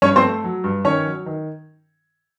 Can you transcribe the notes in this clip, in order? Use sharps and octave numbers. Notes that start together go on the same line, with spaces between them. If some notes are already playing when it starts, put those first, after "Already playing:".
G2 C#4 C#5
C4 C5
A3
F#3
G2
D#3 C#4 C#5
F#3
D#3